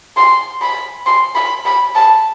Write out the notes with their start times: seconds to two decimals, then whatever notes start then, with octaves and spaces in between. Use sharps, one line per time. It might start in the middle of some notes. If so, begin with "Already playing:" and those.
0.17 C6
0.61 B5
1.06 C6
1.35 B5
1.66 B5
1.95 A5